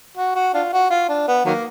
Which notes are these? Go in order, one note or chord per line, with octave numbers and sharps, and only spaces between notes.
F#4
F#4
D4 F4
F#4
F4
D4
B3
D#3 F#3 A#3